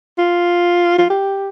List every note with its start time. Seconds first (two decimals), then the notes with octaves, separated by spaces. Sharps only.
0.18 F4
0.98 F4
1.10 G4